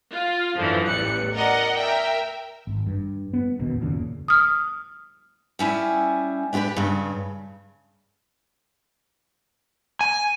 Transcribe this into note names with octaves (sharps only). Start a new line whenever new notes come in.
F4
F#2 A2 D3 E3 F3
A1 E2 G3 F#6 C#7
A#4 D5 D#5 F#5
A#4 E5 G5
G#1
G2
B3
E1 A1 D#2 B2
F#1 D#2 A#2 C#3
D#6 F6
G3 C#4 E4 G#5
D4 E4 F4 G4 B4
G2 C#3
G#5